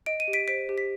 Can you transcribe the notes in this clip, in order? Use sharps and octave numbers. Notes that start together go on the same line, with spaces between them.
D#5 D7
D#7
G4
B6 D7
C5 B6 D7
G4
B6